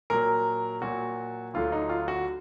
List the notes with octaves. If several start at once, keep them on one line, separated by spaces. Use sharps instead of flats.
A#2 F#3 A#4
A#2 F#3 F#4
D2 D3 F#3 F4
D#4
F4
F#4